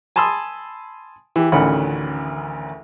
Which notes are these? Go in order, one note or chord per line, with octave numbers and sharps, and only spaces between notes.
G#5 A5 B5 C6 D#6 E6
E3 G4
A1 D2 D#3 C#4 F#5 B5